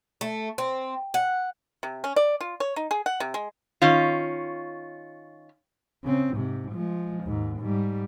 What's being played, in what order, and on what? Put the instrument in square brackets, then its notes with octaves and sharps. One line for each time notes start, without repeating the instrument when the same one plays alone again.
[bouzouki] A3
C4
F#5
[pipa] C3
C#4
D5
F4
C#5
D#4
G#4
F#5
C3
G#3
[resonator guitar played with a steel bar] D#3 C#4 F4
[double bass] C#3 C4
G#2 C3
F3 G#3
D#2 G#2
G#2 G3